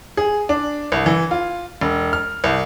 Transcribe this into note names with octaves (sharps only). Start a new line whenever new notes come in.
G#4
D4
C2
E3
F4
E1
F6
C2